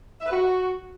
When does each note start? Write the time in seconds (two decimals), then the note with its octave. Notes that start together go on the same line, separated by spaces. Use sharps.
0.21 E5
0.26 B4
0.31 F#4